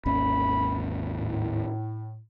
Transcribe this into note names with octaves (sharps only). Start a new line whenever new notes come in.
G#1 D#2 C#4 B5
A2